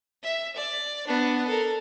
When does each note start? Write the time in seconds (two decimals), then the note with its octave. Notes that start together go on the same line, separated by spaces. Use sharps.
0.23 E5
0.56 D5
1.07 B3 D4
1.47 A4 A#4